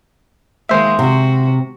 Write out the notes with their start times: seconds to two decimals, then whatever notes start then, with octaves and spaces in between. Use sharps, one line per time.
0.69 D#3 G#3 A#3 C5 E5
0.99 C3 F#4